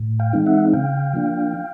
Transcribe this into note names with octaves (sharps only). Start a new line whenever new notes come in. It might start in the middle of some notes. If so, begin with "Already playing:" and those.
Already playing: A2
F5 G5
E3 G#3 C4 D#4
E5 F#5
C#3 F5 G5
F3 A#3 D4